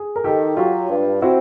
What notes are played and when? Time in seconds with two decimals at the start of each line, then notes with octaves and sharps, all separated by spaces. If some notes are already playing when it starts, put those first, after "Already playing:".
Already playing: G#4
0.16 A#4
0.24 D#3 G4 A4
0.57 F#3 F4 G4
0.89 G2
1.22 C4 E4 F#4